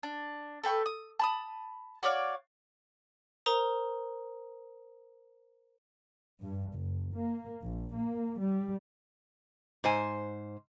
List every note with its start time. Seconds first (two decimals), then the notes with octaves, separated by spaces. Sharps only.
0.03 D4
0.63 A4 B4 G5 C#6
0.86 D#6
1.19 A5 B5 D#6
2.03 F#4 C#5 D5 F5
3.46 A#4 C5 A#5 D#6
6.42 G2
6.74 F#1
7.14 A#3
7.63 A#1
7.95 A#3
8.41 G3
9.84 G#2 C5 G#5